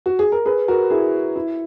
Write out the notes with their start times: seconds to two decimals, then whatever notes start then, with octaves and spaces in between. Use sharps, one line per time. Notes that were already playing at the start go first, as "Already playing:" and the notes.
0.06 F#4
0.19 G#4
0.32 A#4
0.45 G#4 B4
0.68 F#4 A#4
0.90 E4 G#4
1.36 E4